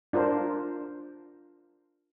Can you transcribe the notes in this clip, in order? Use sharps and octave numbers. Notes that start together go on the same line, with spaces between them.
D4 F4 A#4 C5